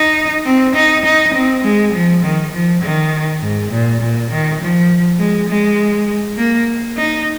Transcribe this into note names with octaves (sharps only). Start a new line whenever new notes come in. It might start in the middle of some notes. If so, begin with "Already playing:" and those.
Already playing: D#4
C4
D#4
D#4
C4
G#3
F3
D#3
F3
D#3
G#2
A#2
A#2
D#3
F3
G#3
G#3
A#3
D#4